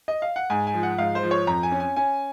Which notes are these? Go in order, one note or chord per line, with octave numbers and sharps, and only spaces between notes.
D#5
F5
F#5
G#2 G#5
G#5
F3
F#5
G#2 F5
C5
F3
C#5
F2 A#5
G#5
C#4
G#5
C#4 G#5